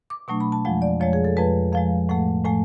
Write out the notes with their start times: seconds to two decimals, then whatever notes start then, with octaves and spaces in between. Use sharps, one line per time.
0.10 D6
0.28 B2 F#3 A3 D4 C#6
0.40 B5
0.52 A5
0.65 F2 F3 G#3 F#5
0.82 D5
1.00 F2 F3 G#3 C#5
1.13 G#4
1.25 A4
1.37 F2 F3 G#3 B4
1.72 F2 F3 G#3 F5
2.09 A2 F3 A3 F#5
2.45 A2 F3 A3 G#5